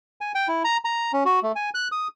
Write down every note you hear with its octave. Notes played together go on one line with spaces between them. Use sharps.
G#5
G5
E4
A#5
A#5
C#4
F#4
A3
G#5
F#6
D#6